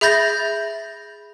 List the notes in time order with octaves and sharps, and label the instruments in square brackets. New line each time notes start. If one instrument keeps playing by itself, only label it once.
[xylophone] G#4 E5 B5 G6 A6 A#6